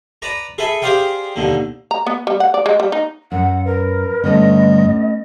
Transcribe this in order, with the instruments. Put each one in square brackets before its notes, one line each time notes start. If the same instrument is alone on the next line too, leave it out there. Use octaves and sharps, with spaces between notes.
[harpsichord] B4 D5 A5 A#5
G#4 A4 B4 E5
G4 G#4 C5 D5 F5 G5
D#2 B2 D3
[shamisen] A#5
B3
G3
F#5
D5
G#3
G3
D#4
[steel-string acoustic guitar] F#2 [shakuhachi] F#5
[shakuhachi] A#4 [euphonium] B4
[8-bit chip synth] G2 D3 G3 [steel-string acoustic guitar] A3 B3 C#4 [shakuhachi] D#5